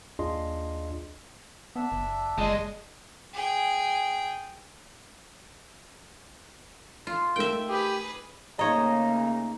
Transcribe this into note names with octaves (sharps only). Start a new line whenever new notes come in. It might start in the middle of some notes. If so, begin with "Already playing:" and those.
D#2 D4 F4 G#4 D#5 C6
B3 D4 E5
F#1
F#1 G#3 D5 D#5 A5
G#4 G5
F4
A3 D#4 A#4 E5 G5
G4 G#4 B4
C#3 A3 A#3 D#4 C#5 D#5 A#5